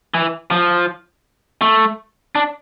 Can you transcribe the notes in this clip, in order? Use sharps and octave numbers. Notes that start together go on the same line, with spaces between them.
E3
F3
A3
D4